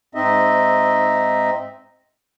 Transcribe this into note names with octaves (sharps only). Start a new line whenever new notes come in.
G#2 C4 D#4 D#5 E5